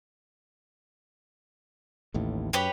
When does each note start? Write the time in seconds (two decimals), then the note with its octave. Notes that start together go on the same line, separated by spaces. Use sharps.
2.14 A1 D#2 A2
2.53 F#2 G4 B4 C#5